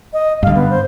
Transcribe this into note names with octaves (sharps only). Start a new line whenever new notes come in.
D#5
G2 D3 F5
B3
C5